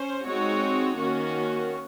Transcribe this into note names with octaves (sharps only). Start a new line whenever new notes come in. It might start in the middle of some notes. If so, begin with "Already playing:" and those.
Already playing: C#4 C5
G#3 C4 D#4 F#4 C#5
D#3 A#3 C#4 F#4